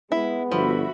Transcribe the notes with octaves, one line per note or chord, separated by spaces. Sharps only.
G#3 B3 E4
G1 F3 F#4 E5 B5